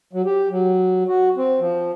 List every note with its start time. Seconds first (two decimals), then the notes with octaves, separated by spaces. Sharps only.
0.13 F#3
0.25 G4
0.51 F#3
1.08 F#4
1.37 C4
1.60 F3